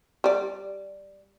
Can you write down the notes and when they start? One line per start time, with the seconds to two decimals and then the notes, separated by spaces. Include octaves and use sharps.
0.24 G3 D5